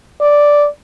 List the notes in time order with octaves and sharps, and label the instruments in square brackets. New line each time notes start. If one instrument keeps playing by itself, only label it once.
[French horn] D5